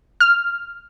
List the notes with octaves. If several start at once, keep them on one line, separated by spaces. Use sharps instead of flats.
F6